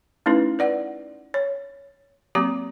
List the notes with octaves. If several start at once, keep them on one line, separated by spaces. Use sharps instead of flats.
A3 C#4 D#4 E4 B4
B4 D5 F#5
C#5
F#3 A#3 C4 G4 A#5 D6